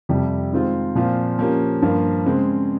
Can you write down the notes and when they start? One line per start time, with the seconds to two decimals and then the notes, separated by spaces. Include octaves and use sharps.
0.09 F2 C3 G3
0.52 D#3 G#3 C4 F4
0.95 A#2 F3 C4 F4
1.39 F3 A#3 C#4 G4
1.82 G2 F3 A#3 F4
2.26 C#3 G#3 C4